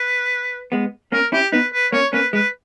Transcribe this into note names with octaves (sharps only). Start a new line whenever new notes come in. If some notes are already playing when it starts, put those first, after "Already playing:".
Already playing: B4
G#3 B3
A#3 C#4 A#4
C#4 E4 G4
B3 D#4 B4
B4
A#3 C#4 C#5
A#3 C#4 B4
G#3 B4